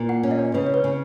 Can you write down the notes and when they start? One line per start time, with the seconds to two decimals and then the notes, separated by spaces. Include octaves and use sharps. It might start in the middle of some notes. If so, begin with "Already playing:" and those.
Already playing: A#2
0.09 F#5
0.23 C#4
0.31 D#5
0.39 C#5
0.54 C#3 B4
0.67 C#5
0.74 B4
0.84 C#3